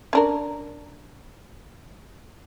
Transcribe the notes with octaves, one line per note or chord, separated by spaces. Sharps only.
C#4 D4 A#4